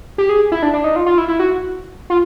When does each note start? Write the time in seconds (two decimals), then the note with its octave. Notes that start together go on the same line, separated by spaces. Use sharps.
0.18 G4
0.29 G#4
0.52 E4
0.63 D4
0.73 D4
0.84 D#4
0.96 F4
1.06 F4
1.18 E4
1.28 E4
1.40 F#4
2.10 F4